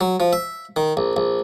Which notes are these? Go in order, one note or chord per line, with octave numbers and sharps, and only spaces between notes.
F#3
F3
E5
D#3
A#1
A#1